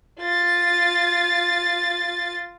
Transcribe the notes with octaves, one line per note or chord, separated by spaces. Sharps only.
F4 A6